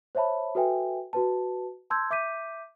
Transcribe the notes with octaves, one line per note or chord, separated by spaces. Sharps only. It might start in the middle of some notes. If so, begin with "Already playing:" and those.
C5 C#5 E5 A5 B5
F#4 A4 B4 E5 G5 G#5
F#4 B4 A5
A5 C6 E6 G6 G#6
E5 D6 G6 B6 D#7